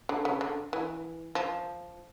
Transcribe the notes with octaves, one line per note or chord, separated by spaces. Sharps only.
D3
C#3
D3
E3
F3